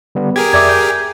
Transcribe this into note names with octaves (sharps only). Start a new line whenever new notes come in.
D3 G3 B3
G4 G#4 A#4 G#6
F2 D5 E5 D6 G#6
G6